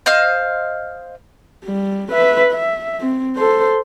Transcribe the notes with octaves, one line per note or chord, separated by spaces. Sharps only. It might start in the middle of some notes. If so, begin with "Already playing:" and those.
C5 D#5 F5 F6
G3
B4 E5
E5
C4
A4 C5